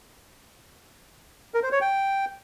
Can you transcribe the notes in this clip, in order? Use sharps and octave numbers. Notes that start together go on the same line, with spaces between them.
A#4
C5
C#5
G5